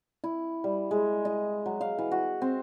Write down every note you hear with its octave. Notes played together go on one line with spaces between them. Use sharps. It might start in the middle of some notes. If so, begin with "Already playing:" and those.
E4
G3
G#3
D#5
F#3
F5
E3
F#4
C4